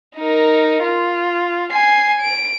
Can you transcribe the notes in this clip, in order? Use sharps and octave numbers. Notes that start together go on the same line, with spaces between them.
D#4 A#4
F4
G#5 C7
D7